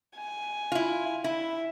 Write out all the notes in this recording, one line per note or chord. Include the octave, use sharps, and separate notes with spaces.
G#5
E4 F4
E4 E5